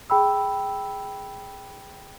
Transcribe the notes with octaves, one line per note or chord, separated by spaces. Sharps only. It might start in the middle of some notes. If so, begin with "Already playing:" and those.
G#4 G5 B5 E6